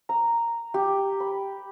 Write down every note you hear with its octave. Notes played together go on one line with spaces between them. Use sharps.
A#5
G4
B5